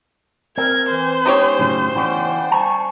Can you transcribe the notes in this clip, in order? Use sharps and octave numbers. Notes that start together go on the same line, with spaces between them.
C4 A#4 G#6
E3 C5
G#3 B3 C#4 D#4 G4 C#5
F#2 A2 C#3
E3 B3 C#4 D5 F#5 G5
G3 C5 G#5 A5 C#6